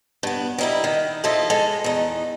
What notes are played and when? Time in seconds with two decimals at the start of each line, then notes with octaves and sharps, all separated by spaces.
0.23 G2 B3
0.58 G3 D#4 E4
0.84 D#3
1.24 F3 E4 F4 A4 D#5
1.50 G#3 A4
1.84 E2 D#4